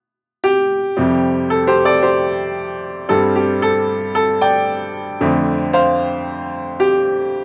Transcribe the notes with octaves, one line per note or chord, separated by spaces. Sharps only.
G4
F2 C3 G3 C4
A4
G4 C5
A4 D5
G4 C5
G2 G3 C4 A4
G4
A4
A4
D5 G5
F2 D3 A3 C4
C5 F5
G4